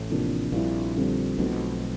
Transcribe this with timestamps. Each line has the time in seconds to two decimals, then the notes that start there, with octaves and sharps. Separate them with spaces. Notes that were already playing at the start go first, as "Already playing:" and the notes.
Already playing: A1 A2
0.10 C3 F3 A#3 D4
0.52 A#1 A#2 G3 C4 E4
0.96 D3 G3 C4 F4
1.38 B1 B2 F3 A3 C4 D#4